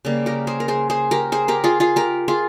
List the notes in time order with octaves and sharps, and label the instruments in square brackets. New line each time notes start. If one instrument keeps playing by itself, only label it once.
[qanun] C#3 G3 A#3
G4 A#4
G#4 C5
A#4
G#4 C5
G#4 C5
G4 A#4
G#4 C5
G4 A#4
F4 G#4
F4 G#4
G4 A#4
F4 G#4